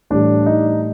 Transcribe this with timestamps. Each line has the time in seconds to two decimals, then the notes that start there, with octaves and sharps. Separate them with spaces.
0.10 A2 E3 G3 D4
0.46 D#4